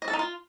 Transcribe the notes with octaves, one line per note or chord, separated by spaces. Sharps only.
D#5
A4
D#4
F4